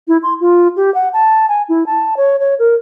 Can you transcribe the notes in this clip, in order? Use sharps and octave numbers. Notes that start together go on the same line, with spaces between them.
E4
C6
F4
G4
F#5
A5
G#5
E4
A5
C#5
C#5
A#4